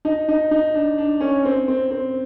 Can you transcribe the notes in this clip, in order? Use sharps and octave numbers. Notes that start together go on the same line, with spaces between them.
D#4
D#4
D#4
D4
D4
C#4
C4
C4
C4